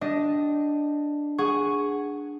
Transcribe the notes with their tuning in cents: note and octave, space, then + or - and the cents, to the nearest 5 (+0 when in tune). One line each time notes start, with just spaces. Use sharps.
D4 +0 G4 -10 D#5 +0
G#4 +0 F#5 +0 C#6 +0